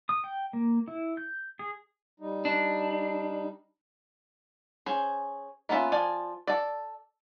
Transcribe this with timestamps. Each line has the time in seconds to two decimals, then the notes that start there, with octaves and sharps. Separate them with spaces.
0.09 D#6
0.24 G5
0.53 A#3
0.88 E4
1.17 G6
1.59 G#4
2.20 G3 D#4
2.45 D4
4.86 C#4 G#4 C5
5.69 A#3 B3 C#4 F4 E5
5.92 F3 D5 G#5
6.47 A4 D5